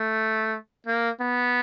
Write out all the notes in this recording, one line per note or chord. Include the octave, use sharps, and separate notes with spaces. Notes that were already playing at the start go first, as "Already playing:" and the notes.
Already playing: A3
A#3
B3